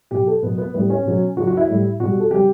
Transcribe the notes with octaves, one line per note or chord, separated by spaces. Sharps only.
B2 F#3 G4
A4
B2 F#3 B3
B3
A2 G3 B3
C#4
B2 F#3
C#3 F#3 F#4
F#4
E4
A2 G3
B2 G3 F#4
A4
C#3 G3 G4